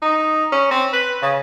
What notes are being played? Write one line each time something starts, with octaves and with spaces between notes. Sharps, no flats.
D#4
C#4
C4
B4
C#3